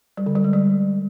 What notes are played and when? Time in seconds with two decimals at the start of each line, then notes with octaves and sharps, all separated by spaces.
0.17 G3
0.26 D3
0.35 G3
0.44 G#3
0.53 G3